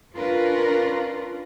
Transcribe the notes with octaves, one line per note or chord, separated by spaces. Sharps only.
C#4 D4 F4 A#4 B4